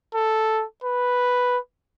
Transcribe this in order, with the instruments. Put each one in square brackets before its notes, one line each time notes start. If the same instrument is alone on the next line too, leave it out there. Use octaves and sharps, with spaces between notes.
[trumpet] A4
B4